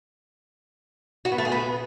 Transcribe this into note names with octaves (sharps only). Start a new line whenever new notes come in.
F#4
B3
A3
G#4
B3